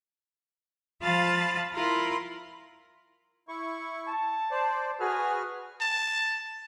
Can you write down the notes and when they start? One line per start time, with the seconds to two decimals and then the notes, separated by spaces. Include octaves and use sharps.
1.00 F3 F4 F5 A5 B5 A6
1.72 E4 F4 A#4 F5 B5 C6
3.48 E4 C#6
4.09 A5
4.51 C5 D5
5.00 F#4 G#4 B4 F6
5.81 A5